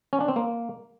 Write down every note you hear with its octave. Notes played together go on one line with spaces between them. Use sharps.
C#4
D4
C4
A#3